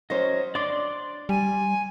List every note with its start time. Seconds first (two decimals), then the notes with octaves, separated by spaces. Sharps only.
0.10 F#3 C#4 C5 D#5
0.55 D4 D5 C6 D6
1.29 G3 G#5